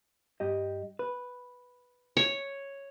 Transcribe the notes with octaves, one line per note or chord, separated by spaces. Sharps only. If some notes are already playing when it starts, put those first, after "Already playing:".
G2 G4 D#5
B4
C#5